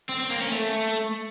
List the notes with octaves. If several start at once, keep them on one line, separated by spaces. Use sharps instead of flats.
C4
C4
A#3
C#4
A3